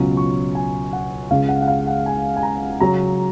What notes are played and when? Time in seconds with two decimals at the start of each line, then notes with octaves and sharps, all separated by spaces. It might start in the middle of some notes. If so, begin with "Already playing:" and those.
Already playing: C#2 B2 F#3 C#4 F4
0.17 C#6
0.55 G#5
0.93 F#5
1.30 C#2 C#3 G#3 F5
1.49 F#5
1.62 F#5
1.68 F5
1.87 F#5
2.06 G#5
2.37 G#5
2.43 A#5
2.80 C#3 F#3 C#4 A#5